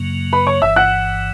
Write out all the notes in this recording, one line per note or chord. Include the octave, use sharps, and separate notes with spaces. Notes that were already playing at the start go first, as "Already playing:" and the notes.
Already playing: F#2 C#3 F#3 A#3
B4 B5
C#5 C#6
G1 G2 E3 E5 E6
F#5 F#6